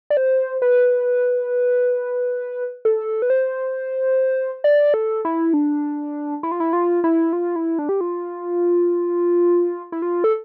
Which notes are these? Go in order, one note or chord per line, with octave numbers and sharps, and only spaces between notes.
D5
C5
B4
A4
B4
C5
D5
A4
E4
D4
E4
F4
E4
F4
E4
F4
E4
D4
G4
F4
E4
F4
A4